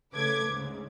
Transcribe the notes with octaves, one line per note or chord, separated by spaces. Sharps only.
C#3 A3 A4 B4 D6 G#6
D2 G#2 C#3